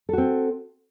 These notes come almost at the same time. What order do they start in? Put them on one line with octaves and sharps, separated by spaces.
A4 F#4 C4